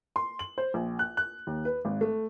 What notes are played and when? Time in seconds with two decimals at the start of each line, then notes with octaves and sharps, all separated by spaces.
0.16 C6
0.39 F#7
0.58 C5
0.74 A#1
0.99 F#6
1.17 F#6
1.47 D#2
1.65 B4
1.85 G#1
2.01 A3